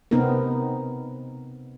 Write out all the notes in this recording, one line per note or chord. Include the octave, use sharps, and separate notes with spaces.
C3 B3 C4 D#4 A#4